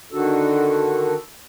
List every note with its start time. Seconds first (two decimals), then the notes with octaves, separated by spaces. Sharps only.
0.12 D3 D#3 D4 F#4 A4